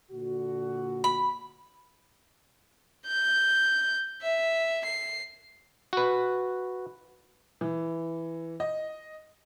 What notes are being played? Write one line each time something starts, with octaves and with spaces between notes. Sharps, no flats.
A#2 D3 F#4
B5
G6
E5
C7
F#4 B4
E3
D#5